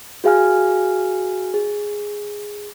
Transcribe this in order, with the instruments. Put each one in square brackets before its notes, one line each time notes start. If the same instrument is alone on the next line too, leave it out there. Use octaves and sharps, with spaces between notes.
[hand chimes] F#4 G#4 F5 G#5 F6
G#4